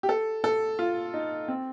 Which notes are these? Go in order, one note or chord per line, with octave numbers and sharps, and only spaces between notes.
G4
A4
A4
F4
D#4
C4